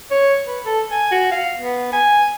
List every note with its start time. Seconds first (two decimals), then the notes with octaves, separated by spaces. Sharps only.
0.11 C#5
0.46 B4
0.65 A4
0.91 G#5
1.11 F#4
1.32 F5
1.58 B3
1.93 G#5